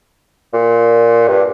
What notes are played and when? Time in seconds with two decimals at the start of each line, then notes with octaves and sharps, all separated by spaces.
0.53 A#2
1.28 G2